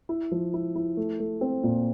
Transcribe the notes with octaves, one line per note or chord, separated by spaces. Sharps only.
E4
F3
E4
E4
A3
A3
C4
A#2